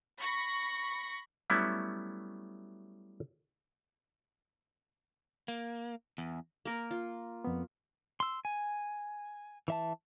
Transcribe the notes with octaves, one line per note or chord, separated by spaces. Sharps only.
B5 C#6 A#6
F#3 G3 A3 B3 C#4 E4
A#3
E2
A#3 A#4
F4
F2 B3
C6 E6
G#5
E3 E5 A5